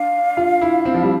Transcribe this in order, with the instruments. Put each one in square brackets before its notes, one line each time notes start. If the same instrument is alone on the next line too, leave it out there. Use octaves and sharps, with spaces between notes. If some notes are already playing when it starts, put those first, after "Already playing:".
Already playing: [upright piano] D4 [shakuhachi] F5
[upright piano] F4
E4
C4
F3
G3